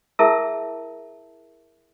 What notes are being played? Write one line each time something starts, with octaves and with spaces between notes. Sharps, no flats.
E4 G#4 A#4 E5 A5 E6